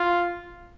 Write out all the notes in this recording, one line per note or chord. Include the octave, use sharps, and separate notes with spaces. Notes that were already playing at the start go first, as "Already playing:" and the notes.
Already playing: F4